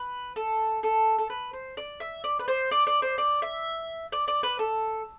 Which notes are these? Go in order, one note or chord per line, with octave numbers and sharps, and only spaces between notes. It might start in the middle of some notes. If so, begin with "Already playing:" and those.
Already playing: B4
A4
A4
A4
B4
C5
D5
E5
D5
B4
C5
D5
D5
C5
D5
E5
D5
D5
B4
A4